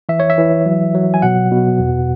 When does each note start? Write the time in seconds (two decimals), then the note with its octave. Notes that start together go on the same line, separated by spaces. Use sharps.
0.09 E3 E5
0.20 C#5
0.30 E5
0.38 E3
0.66 F#3
0.94 F#3
1.14 G#5
1.22 B2 F#5
1.51 B2
1.80 E2